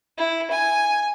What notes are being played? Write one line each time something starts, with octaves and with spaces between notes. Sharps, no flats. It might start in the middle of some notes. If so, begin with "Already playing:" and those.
E4
G#5